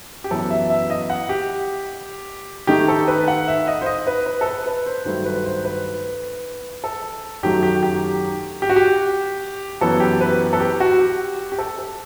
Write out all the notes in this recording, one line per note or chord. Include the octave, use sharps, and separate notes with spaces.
G4
F#2 E3 B3 A4
E5
E5
D#5
F#5
G4
D#3 A3 D#4 G4
A4
B4
F#5
E5
D#5
C5
D#5
B4
B4
A4
B4
B4
C5
G2 D#3 F#3 A3 C5
B4
C5
B4
A4
F#2 D#3 F#3 A3 G4
G4
G4
G4
F#4
G4
F#2 E3 B3 A4
G4
B4
A4
G4
F#4
G4
G4
A4
A4